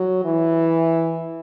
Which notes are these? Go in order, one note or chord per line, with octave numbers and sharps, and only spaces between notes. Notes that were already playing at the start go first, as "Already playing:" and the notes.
Already playing: F#3
E3